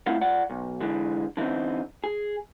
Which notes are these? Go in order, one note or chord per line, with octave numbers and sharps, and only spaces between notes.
A3 C4 E4 F4 F5 F#5
F4 D5 F#5
B1
D3 E3 G#3
D3 E3 G3 C4 D#4
G#4